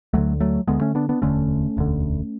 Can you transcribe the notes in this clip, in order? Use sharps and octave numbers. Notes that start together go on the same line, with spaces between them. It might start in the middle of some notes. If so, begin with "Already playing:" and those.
D2 D3 F#3 A3
F#3 A3
D2 D3 G#3 B3
A3 C#4
B3 D4
B3 D4
E1 D2 D3 A3 C#4
E1 D2 D3